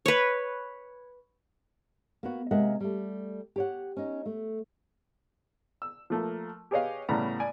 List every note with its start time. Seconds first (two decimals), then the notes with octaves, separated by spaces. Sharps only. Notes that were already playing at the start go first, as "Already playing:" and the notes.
0.06 B4 C#5
2.23 A#3 B3 F#4
2.51 C3 G#3 A#3 A#4 E5 F#5
2.80 G3 A3
3.56 G4 C#5 F#5
3.97 C#4 D#4
4.26 A3
5.82 E6
6.10 F3 A3 A#3
6.71 G4 G#4 B4 C#5 D#5 F5
7.09 A2 C#3 G3 B3 A#5
7.40 D5 G#5